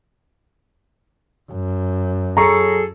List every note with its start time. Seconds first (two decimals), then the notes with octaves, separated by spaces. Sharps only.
1.52 F#2
2.37 F#3 G#4 A4 A#5 C#6